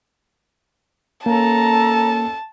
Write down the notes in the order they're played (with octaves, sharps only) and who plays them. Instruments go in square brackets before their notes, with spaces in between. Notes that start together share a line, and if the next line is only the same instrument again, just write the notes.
[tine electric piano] A#3 [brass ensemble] C#4 A4 [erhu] A5 [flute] A#5